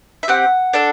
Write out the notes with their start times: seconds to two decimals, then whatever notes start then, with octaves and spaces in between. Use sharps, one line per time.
0.23 E5
0.28 C4 G4 F#5
0.73 D4 A4